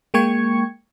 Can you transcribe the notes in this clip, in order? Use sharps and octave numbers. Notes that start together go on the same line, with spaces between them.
G#3 A#3 G5 C#6 G#6 C#7